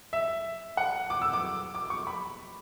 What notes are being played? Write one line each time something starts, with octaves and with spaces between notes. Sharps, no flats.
E5
F#5
D6
E6
D6
D6
C#6
B5